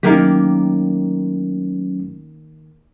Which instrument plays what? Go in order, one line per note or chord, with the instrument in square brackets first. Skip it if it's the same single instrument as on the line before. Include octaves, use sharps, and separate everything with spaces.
[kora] D#3 A#3 G4 [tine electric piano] F#3 A3 C#4